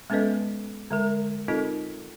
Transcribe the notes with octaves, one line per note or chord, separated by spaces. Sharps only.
G#3 B3 C#4 A4 B4 D#5
D3 G#3 A#4
C4 D#4 F4 A4 A#4 D#5